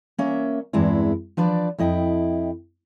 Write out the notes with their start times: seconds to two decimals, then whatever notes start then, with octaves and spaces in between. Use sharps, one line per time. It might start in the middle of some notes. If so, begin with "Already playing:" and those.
0.18 A#3 C#4 E5
0.73 E2 G2 G#3 C4 E4
1.37 F3 D4 B4 D5
1.78 F2 E4 D#5 G5